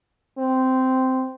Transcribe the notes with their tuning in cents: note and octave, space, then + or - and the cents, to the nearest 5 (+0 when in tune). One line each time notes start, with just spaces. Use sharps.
C4 -10